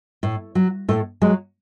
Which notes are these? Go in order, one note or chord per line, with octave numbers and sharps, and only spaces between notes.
A2
F#3
A2 A3
F#3 G#3